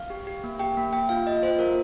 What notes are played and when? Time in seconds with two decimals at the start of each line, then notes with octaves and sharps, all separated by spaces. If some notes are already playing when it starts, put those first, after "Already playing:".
Already playing: F5
0.10 G4
0.27 G4
0.44 A#3
0.59 G4 G5
0.77 A#3
0.93 A#3 G5
1.09 F4 F5
1.26 F4 D#5
1.43 F4 C5
1.59 A#3 A#4